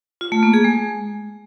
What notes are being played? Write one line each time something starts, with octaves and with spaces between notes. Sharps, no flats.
F4
A3
A#3
G#4
G#3